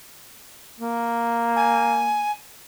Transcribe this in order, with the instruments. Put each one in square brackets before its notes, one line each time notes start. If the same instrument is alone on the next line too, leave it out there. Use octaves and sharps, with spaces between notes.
[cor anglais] A#3
[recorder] G#5